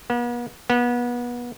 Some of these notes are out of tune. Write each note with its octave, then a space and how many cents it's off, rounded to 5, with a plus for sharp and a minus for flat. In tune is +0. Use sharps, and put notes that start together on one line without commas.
B3 -45
B3 -30